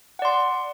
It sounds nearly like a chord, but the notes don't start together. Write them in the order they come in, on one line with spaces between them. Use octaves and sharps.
F#5 D5 C6